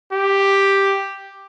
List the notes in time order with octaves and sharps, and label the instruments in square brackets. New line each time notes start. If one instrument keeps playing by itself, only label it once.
[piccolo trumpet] G4